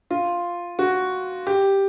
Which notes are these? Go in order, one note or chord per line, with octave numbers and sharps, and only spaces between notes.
F4
F#4
G4